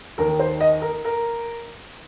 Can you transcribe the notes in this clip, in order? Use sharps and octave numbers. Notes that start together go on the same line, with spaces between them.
D#2 D#3 A#4
C5
D#5
A#4
A#4